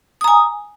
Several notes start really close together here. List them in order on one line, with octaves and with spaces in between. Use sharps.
D#6 A#5 G#5